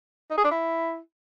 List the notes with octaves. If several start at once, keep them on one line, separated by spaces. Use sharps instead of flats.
D#4
G#4
D4
E4